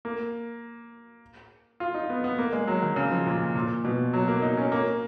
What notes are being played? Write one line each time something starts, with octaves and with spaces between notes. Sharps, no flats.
A#3
F4
D#4
B3
B3
A#3
G#3
F#3
D#3
C#3
F3
A#2
A#2
B2
F#3
A#3
D#4
C#4
A#3